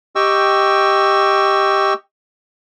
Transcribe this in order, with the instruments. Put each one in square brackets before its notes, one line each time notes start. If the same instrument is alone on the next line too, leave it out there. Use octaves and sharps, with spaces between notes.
[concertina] G4 D#5 G5 C#6 E6